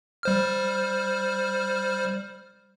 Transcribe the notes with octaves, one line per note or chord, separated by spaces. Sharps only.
G3 C5 F6